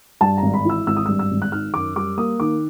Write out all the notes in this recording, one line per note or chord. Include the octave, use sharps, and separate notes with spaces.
G2 A5
G#1 A#5
B5
E3 E6
G#1 E6
D#6
G2 E6
E6
G#1
F#6
D#3 F6
F#2 D6
G3 D6
A#3 D#6
D#3 D6